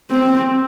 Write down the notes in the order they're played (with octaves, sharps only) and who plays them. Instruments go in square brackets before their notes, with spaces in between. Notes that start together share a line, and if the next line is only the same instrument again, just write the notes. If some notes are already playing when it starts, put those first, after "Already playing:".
[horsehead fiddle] C4